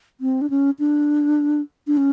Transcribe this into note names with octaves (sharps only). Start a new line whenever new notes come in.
C4
D4
C#4
D4
D4
C#4